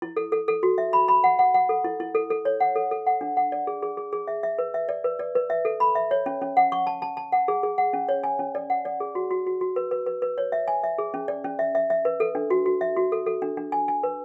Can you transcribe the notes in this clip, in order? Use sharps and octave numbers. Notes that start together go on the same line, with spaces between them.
E4
A4
A4
A4
F#4
E5
B5
B5
F#5
F#5
F#5
A4
E4
E4
A4
A4
C#5
F#5
A4
A4
F#5
D4
F#5
D5
G#4
G#4
G#4
G#4
E5
E5
B4
E5
D5
B4
D5
B4
E5
A4
B5
E5
C#5
C#4
C#4
F#5
C#6
A5
A5
A5
F#5
G#4
G#4
F#5
C#4
C#5
G#5
C#4
D5
F#5
D5
G#4
F#4
F#4
F#4
F#4
B4
B4
B4
B4
C#5
E5
G#5
E5
G#4
C#4
D5
C#4
E5
E5
E5
B4
A4
D4
F#4
F#4
E5
F#4
A4
A4
D4
D4
G#5
G#5
B4